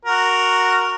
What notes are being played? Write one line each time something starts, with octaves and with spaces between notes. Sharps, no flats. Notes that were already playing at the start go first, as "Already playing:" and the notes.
F#4 A#4